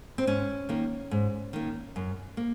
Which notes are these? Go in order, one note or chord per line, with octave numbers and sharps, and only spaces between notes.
C4
G#2 C#4
D#3 A#3
G#2
D#3 A#3
F#2
A#3